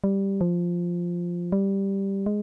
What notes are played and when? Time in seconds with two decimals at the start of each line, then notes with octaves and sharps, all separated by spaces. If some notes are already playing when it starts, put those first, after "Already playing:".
0.04 G3
0.41 F3
1.52 G3
2.26 G#3